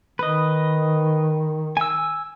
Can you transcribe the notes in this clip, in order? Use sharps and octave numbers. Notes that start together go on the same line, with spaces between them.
D#3 B4 D#5
G#5 E6